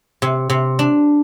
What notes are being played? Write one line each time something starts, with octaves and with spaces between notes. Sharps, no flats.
C3
C3
D4